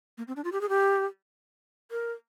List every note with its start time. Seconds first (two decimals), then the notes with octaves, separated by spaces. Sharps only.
0.18 A#3
0.28 C4
0.36 D4
0.44 F4
0.52 G4
0.61 G#4
0.69 G4
1.91 A#4